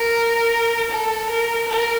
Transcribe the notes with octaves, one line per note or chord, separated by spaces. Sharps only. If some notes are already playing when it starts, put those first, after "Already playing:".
Already playing: A#4
A4
A#4
A#4